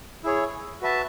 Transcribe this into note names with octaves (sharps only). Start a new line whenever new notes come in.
E4 G#4 C#5
F#4 B4 E5 A5